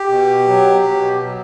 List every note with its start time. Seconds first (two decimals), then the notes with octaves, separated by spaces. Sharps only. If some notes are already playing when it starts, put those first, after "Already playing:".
Already playing: G4
0.09 B2
0.46 F#3
0.85 B2
1.22 F#3